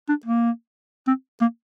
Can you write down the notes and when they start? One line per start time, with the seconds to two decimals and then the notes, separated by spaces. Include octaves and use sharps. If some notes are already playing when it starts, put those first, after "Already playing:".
0.09 D4
0.26 A#3
1.07 C4
1.41 A#3